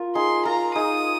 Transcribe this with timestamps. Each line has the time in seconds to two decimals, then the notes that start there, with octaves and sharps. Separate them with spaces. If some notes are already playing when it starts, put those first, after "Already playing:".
Already playing: F4 A#4
0.15 D#4 G#4 C6
0.45 F4 A#4 A#5
0.75 D#4 G#4 D#6